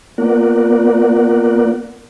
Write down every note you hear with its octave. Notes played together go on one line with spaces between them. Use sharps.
A#3 B3 F4 A#4 D5 F#5